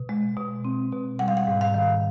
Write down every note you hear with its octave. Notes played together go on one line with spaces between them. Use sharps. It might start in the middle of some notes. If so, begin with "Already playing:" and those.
Already playing: B2
G#3
B2
C4
B2
G3 F#5
F5
F#5
G#2
F5
D#3